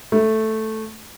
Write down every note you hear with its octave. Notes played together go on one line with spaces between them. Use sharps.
A3